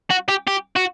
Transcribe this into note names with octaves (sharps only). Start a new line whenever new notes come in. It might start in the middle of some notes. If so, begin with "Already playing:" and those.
F#4
G4
G4
F#4